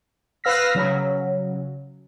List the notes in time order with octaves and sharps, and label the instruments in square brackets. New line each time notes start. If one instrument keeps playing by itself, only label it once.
[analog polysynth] B4 F5 E6 F6 A#6 B6
C#3 F#3